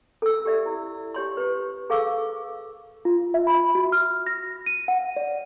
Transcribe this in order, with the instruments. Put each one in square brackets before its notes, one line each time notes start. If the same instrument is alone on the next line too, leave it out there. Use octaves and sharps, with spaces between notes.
[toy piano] A4 E6
G4 A4 D5 E5
E4
G4 C#5 C6
G4 B4
G#4 A4 F5 C#6 D6 E6
[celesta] F4
E5
B5
F#4
F6
A#6
D#7
F#5
D5